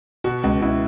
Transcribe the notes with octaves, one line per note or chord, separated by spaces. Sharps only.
B2 F#4
C#2
C#2 E4